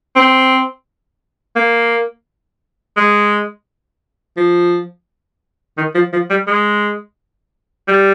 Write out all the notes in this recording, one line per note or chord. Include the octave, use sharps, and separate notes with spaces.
C4
A#3
G#3
F3
D#3
F3
F3
G3
G#3
G3